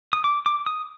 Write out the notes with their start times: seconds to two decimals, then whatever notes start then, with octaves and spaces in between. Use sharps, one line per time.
0.13 D#6
0.24 D6
0.46 D6
0.66 D#6